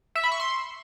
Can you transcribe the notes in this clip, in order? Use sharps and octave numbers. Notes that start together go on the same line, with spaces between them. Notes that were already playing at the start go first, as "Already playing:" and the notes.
E5
B5
C#6
C6